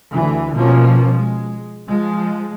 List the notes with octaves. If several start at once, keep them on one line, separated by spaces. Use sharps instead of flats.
D2 D3 E3
B2 F3 A#3 C#4
G#3
F3 G#3